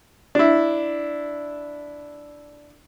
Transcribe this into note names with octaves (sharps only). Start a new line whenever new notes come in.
D4 E4